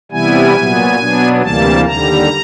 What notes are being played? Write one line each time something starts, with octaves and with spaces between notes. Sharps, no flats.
C3 E3 G3 B3 E4 G#5
A#2 F#3 B3
B2 F#3 B3 D4
D2 C3 E3 G3 A#3 A5
D#2 D3 G3 A#5